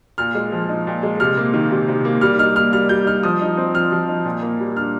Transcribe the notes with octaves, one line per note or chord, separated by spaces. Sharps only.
A#2 F6
G#3
F3
D#4
A#2
G#3
C3 F6
A#3
D#3
C3
C3
A#3
G3 F6
D#4 F6
A#3 F6
G3 F6
G3 G6
D#4 F6
F3 D#6
D#4
C4
F3 F6
F3
D#4
A#2
A#3
G3
D4 F6